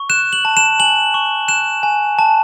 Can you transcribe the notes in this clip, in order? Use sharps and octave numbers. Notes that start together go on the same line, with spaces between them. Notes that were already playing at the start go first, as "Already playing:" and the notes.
Already playing: C#6
F#6 E7
F#7
A5
E7
G#5 F#7
C#6
F#6 E7
G#5
A5